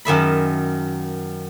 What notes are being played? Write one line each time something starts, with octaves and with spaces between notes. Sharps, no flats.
F#2 D#3 E5 B5